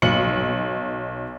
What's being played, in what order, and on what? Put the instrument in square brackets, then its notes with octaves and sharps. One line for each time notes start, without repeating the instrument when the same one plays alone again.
[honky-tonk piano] B1 C#7 F#7